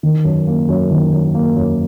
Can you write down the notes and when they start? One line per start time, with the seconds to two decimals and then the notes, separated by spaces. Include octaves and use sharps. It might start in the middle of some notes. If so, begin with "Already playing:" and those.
0.03 D#3
0.24 F#2
0.47 A#3
0.69 F#2
0.91 D#3
1.12 F#2
1.34 A#3
1.56 F#2